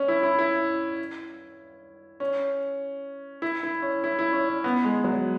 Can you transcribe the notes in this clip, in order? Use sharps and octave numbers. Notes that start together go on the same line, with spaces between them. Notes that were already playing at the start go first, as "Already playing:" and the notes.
Already playing: C#4
E4
E4
E4
C#4
E4
E4
C#4
E4
E4
C#4
C#4
B3
G#3
F#3